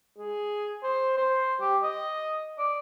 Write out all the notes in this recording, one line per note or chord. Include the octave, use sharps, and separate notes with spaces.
G#4
C5
C5
G4
D#5
D5